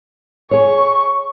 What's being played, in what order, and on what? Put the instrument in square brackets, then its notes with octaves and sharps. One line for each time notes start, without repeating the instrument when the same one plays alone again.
[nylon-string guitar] G#4 C#5 [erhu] C#6